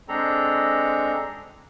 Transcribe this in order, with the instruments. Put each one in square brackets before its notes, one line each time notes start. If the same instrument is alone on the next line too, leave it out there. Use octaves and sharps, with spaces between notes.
[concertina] G#3 C4 D4 A4 A#5